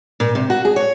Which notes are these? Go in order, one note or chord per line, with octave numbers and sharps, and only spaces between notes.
A#2
C3
F#4
G#4
C#5